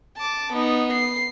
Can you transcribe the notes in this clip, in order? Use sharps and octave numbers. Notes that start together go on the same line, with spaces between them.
A5 D6
B3 D#4
C7